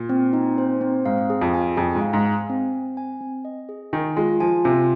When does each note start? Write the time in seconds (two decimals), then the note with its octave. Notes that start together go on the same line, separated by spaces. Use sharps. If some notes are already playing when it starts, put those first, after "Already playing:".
Already playing: A#2
0.09 C4
0.33 D#4
0.58 C5
0.81 C4
1.06 G#2 F5
1.30 G#4
1.42 F2
1.54 G#5
1.77 F2 G#4
1.95 G#2
2.01 F5
2.13 G#2
2.26 G#5
2.50 C4
2.73 C4
2.97 G#5
3.21 C4
3.45 D#5
3.69 G#4
3.93 D#3 G#5
4.17 G#3 F4
4.40 F3 G#5
4.64 C3 F4